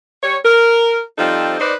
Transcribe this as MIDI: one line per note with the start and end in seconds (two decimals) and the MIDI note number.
0.23 0.36 55
0.23 0.36 73
0.45 1.01 70
1.18 1.59 53
1.18 1.59 55
1.18 1.59 60
1.18 1.59 63
1.18 1.59 69
1.60 1.74 63
1.60 1.74 71
1.60 1.74 72
1.60 1.74 74